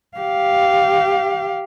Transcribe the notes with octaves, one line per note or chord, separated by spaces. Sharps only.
G4 F5